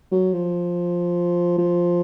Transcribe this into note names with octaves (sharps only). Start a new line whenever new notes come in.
F#3
F3
F3